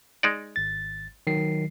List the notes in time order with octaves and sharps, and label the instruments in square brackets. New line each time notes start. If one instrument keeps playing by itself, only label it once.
[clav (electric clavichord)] G#3 D#4 D5
[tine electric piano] G#1 A6
D#3 F#3 C7